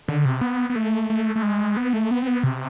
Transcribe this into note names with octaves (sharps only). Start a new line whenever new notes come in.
D3
C3
B3
B3
A3
A3
A3
G#3
B3
A3
B3
C4
B3
C3